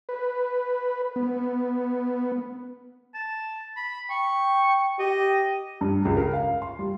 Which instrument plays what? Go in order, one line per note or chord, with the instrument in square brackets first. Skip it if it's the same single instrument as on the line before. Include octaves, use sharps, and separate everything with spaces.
[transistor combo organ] B4
B3
[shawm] A5
B5
[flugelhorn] G5 [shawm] C#6
[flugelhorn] G4 [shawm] D#5
[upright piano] G2
C#2
A#4
F5
C6
G3